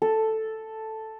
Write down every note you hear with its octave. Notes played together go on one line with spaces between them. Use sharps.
A4